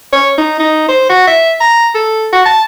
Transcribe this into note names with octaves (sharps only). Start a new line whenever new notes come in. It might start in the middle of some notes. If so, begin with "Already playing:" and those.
C#5
D#4
D#4
C5
F#4
E5
A#5
A4
F#4
A5